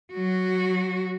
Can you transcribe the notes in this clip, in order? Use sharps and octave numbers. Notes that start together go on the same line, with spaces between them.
F#3 F#4